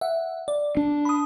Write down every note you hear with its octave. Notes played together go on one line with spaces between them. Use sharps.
E5 F#5
D5
D4
B5 D#6